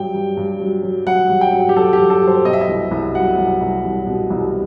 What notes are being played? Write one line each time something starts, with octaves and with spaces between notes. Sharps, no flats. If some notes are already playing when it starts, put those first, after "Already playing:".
Already playing: G2 F#3 G5
G2
G2
F#3
F#3
F#3 F#5
G2
G5
F#3
G4
F#3 A4
G4
G2
A4
F#3 C5
B2 D#5
E5
D#5
C2
C2
F#3 F#5
C2
C2
C2
B2
C2